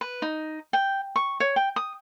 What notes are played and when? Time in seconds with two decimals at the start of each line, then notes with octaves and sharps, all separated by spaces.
0.01 B4
0.22 D#4
0.73 G5
1.16 C#6
1.40 C#5
1.56 G5
1.76 D#6